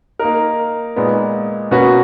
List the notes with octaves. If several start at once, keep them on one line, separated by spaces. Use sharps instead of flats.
A#3 D#4 A#4
A#2 G#3 B3 D#4
B2 A#3 C#4 F#4 B4